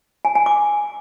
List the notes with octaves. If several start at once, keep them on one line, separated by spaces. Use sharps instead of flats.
G#5
G#5
D6